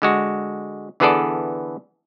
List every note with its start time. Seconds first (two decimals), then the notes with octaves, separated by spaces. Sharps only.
0.02 D3 G#3 F#4
1.00 D3 E3 B3 G#4 A4 D5